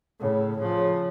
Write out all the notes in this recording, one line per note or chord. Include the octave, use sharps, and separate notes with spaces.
A2 C#3
C#3 F3